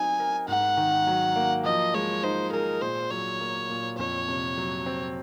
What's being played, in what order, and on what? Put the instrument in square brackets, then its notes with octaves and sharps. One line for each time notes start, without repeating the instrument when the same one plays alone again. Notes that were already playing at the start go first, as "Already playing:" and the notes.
Already playing: [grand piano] F#3 C4 D#4 [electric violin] G#5
[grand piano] A#4
[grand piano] G#2 [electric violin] F#5
[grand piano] D#3
F#3
A#3
[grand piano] F3 [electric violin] D#5
[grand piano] G#3 [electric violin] C#5
[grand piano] D#4 [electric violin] C5
[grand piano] G#4 [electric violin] A#4
[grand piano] A#2 [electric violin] C5
[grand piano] F#3 [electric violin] C#5
[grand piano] A#3
A#2
[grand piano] F2 [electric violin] C#5
[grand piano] C3
F#3
C4